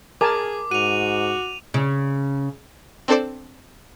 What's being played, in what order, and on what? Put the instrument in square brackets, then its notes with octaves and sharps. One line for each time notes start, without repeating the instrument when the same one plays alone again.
[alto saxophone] G#4 [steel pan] A#4 G#5 A5 [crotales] D6
[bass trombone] G#2 [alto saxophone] F#4 [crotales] D#7 F7
[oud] C#3
[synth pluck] C4 D4 A4 C5 D5